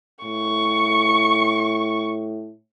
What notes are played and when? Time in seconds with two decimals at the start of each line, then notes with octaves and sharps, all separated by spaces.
0.24 A2 C#6